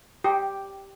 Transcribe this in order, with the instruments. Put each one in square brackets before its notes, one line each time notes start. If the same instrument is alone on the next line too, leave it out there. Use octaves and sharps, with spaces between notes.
[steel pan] G4